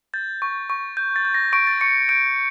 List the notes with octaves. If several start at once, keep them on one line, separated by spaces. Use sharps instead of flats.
G6 A6
C#6
C#6
G6
A6
G6
A#6
C#6 D7
A6
C#6 C#7
G6 D7